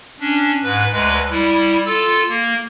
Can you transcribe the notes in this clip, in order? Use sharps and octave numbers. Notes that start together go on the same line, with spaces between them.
C#4 D4
G#2 B4
D2 G#3 B4
G3 E4
F4 A4 E6
A#3